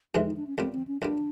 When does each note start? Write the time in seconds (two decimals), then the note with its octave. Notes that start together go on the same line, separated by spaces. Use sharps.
0.14 F2 C3 E3 G#3 D#4
0.26 D#4
0.37 D4
0.47 C#4
0.58 B1 A#2 G3 C4
0.72 C4
0.87 C#4
1.02 B1 A#2 G3 D4